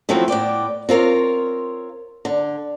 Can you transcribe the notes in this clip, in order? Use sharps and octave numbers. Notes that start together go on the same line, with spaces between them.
D#3 F3 F#3 A3 C4 E4
A2 B3 D5 G5
C4 F4 A#4 C#5
D3